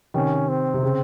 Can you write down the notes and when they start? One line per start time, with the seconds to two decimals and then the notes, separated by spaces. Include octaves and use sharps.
0.14 C3 D#3 C#4
0.48 C4
0.74 C3
0.83 C#3